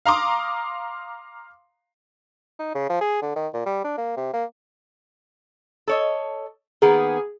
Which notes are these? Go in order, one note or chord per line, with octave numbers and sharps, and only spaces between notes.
F5 A#5 C6 D6 D#6
D#4
C#3
F3
G#4
D3
D#3
A#2
G3
D4
A#3
C3
A#3
A4 C#5 D#5
D#3 A#3 B3 G#4